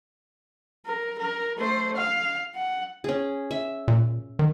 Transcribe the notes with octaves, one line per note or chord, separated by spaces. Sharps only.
A#4
A#4
A3 C5
F5
F#5
C#4 G#4
E5
A#2
D#3